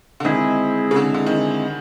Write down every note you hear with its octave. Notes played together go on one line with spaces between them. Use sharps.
D3
D#3 G#3 C4 E4 G#4
C#3
D3
D3
D#3